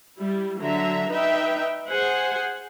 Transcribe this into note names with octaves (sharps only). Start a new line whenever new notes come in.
G3 E4
D3 F#3 E5 A#5
D#4 B4 E5 G5
G#4 C5 F#5 G#5